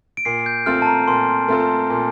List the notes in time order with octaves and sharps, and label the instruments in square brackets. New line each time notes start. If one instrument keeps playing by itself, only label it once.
[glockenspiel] D7
[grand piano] A#2 [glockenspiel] C7
[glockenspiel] G6
[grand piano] A3 C4 F4 A4 [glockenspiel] F6
[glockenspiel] A5
A#5
[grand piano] A#2 [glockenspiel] C6
[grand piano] A3 C4 F4 A4
A#2